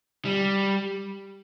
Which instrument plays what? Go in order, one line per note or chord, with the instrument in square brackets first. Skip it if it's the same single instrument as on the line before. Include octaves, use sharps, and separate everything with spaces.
[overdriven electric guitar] G3